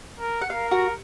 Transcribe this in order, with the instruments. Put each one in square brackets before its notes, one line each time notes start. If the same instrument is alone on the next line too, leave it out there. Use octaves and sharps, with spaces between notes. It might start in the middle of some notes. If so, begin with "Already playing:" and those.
[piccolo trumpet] A#4
[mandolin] F#5
[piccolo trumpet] A#4 [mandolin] F5
[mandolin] F#4